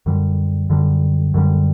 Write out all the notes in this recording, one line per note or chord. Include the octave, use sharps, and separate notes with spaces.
F#2 D3 G3
F#2 D3 G3
F#2 D3 G3